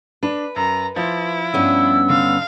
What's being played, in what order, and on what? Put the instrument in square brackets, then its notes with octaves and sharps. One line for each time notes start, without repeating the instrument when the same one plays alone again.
[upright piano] D4 [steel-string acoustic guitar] B4
[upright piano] F#2 [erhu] A#5
[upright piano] F3 [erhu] E4
[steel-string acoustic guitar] G2 B3 C#4 [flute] E6
[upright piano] D3 [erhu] F5